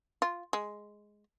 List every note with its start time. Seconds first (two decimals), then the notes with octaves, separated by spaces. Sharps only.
0.22 F4
0.53 G#3